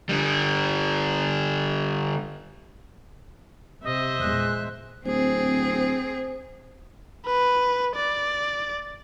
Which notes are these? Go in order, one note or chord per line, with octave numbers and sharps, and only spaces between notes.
D3 G3
C3 C5 D#5 E5
E2 A#2 G#3 F#6
D1 C4 G#4 C5
B4
D5